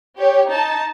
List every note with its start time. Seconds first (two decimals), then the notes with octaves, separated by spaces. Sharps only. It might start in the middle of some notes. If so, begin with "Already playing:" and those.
0.19 G4 C#5
0.51 D#4 A5